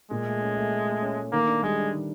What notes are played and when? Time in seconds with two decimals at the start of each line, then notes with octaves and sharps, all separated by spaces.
0.11 A#2 G#3
0.26 A3
0.41 C#4
0.56 A3
0.72 A3
0.87 A3
1.02 C#4
1.17 A3
1.32 D#3 A#3
1.48 D4
1.63 G3 G#3
1.78 D4
1.93 D#3